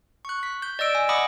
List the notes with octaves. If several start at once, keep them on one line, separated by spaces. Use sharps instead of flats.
C#6 F#6
B6
G6
D5 D#5 E6 D7
G#5
D#5 F#5 B5 D6 D#6